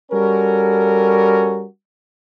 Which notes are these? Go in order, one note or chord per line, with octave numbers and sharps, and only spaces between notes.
G3 C#4 F#4 A4 A#4